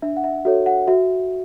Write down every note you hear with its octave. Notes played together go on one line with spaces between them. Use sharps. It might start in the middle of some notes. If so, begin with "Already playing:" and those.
D4 E5
F#5
E5
F#4 A4 C#5 E5
F#5
F#4 E5